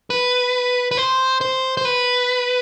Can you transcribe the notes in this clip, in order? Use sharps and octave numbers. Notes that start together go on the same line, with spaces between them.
B4
B4
C5
C5
C5
B4